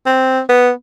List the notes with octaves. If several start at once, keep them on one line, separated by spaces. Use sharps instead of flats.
C4
B3